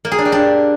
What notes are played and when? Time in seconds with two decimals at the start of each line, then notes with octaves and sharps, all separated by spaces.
0.05 A#3
0.12 G#4
0.18 D4
0.25 G4
0.32 D4